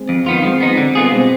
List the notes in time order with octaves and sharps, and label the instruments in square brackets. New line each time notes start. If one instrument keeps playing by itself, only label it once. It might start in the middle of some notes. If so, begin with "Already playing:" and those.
Already playing: [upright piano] G#3 C4
[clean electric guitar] F2
D#3 B3 F4
[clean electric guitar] F3 [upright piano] G#3 C4
[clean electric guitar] B3 D#4
D3
G3 B3 F4 G#4
[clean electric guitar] B2 [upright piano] G#3 C4